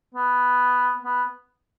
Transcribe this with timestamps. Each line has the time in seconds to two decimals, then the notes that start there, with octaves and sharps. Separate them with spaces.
0.15 B3
1.04 B3